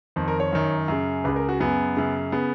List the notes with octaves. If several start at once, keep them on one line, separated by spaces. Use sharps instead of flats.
F2 D#3
A#4
C#5
F#2 D#3
F#2 C#3
C#2 C#3 B4
A#4
F#4
F#2 C#3 B3
F#2 C#3
C#3 B3